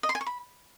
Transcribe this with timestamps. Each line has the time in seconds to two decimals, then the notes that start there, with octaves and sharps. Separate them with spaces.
0.03 D#5
0.09 C6
0.15 G#5
0.21 C#6
0.26 B5